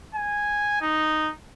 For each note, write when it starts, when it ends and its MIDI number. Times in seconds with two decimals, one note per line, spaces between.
0.15 0.77 80
0.82 1.30 63